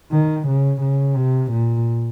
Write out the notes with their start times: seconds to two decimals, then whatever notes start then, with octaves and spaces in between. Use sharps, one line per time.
0.12 D#3
0.47 C#3
0.81 C#3
1.16 C3
1.51 A#2